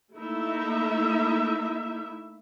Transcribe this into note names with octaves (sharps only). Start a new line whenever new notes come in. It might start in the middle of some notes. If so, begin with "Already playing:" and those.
A3 A#3 D#4 E4 E5